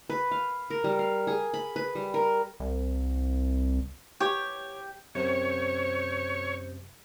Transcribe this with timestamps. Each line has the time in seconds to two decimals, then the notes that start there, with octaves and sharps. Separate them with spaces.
0.10 B4
0.31 F5
0.70 A#4
0.84 G3
0.99 F5
1.27 G#4
1.54 B5
1.76 B4
1.95 G3
2.14 A#4
2.60 C2
4.20 G4 C#5
5.15 F#2 C3 C5 C#5